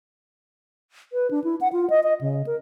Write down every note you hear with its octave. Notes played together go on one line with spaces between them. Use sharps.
B4
D4
E4
F#5
F4
D#5
D#5
C#3
A#4